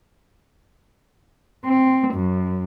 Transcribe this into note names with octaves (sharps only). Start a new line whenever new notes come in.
C4
F#2